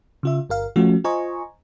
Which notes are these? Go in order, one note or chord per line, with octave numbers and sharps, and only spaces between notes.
C#3 F4 E5
G1 A#4 F5
F3 A3 C#4 F4 F#4
F4 C5 D#5 G#5 A#5 C#6